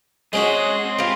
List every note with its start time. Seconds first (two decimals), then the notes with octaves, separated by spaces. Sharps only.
0.33 G#3 C4 C#4 F#4 G#4
0.84 C4
0.99 C4 F4 G4 B4